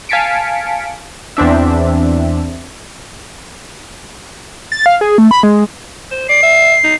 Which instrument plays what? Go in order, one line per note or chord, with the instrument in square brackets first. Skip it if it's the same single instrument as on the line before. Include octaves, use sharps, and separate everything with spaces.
[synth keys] F5 G#5 A5 B6 C#7 D7
E2 C4 D4 E5
[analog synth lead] A6
F5
G#4
A3
B5
G#3
[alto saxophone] C5
[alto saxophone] D5 [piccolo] C7
[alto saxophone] E5
D#4